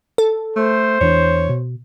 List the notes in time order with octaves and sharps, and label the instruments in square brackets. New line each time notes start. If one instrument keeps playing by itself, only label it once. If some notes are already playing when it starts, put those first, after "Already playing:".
[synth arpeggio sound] A4
[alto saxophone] A3 [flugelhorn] C5
[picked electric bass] E2 E3 D4 [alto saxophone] C#5
[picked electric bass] B2